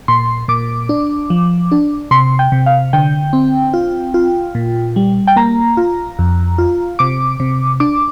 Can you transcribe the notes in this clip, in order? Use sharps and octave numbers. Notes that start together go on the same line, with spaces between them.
A#2 C6
A#2 D6
D4
F3
D4
C3 C6
G5
C3
F5
D3 G5
C4
F4
F4
A#2
G3
G5
A#3 A#5
F4
F2
F4
C3 D6
C3
D4 D6